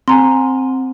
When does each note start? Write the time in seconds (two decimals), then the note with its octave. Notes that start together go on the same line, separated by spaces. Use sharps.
0.08 C4 G#5 A#5 C6